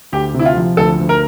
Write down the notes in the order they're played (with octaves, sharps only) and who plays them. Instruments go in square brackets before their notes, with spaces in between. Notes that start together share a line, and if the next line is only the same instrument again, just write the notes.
[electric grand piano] D2 [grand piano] G4
[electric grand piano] C3
[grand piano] E4
F4
[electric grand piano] F3
[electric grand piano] D2 [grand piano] A4
[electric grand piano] D2
[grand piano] A#4